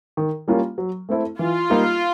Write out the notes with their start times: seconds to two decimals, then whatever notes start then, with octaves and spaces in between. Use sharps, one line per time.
0.17 D#3
0.48 G3 A#3 C#4 F4
0.78 F#3
1.09 A3 C4 E4 A4
1.39 E3 F4
1.70 G3 A#3 D#4